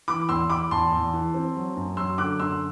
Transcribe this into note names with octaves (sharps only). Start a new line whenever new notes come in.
E3 B5 D6
E2 C6 E6
E3 B5 D6
E2 A5 C6
E2
E3
C4
F#3
F#2
F#3 C6 E6
D3 D6 F#6
F#2 C6 E6